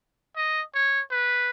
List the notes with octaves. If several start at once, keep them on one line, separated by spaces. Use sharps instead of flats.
D#5
C#5
B4